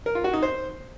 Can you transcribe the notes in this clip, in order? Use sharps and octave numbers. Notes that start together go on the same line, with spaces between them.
A#4
F4
F#4
D#4
C5